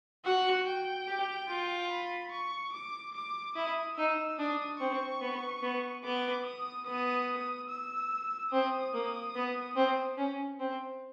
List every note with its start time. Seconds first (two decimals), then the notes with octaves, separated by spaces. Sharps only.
0.25 F#4 F#5
0.67 G5
1.08 G4
1.49 F4
1.90 B5
2.32 C#6
2.73 D6
3.15 D6
3.56 E4 D#6
3.97 D#4 E6
4.39 D4 D#6
4.80 C4 C#6
5.21 B3
5.63 B3
6.04 B3 D6
6.45 D#6
6.87 B3 D#6
7.69 E6
8.52 C4 D#6
8.93 A#3
9.35 B3
9.76 C4
10.17 C#4
10.59 C4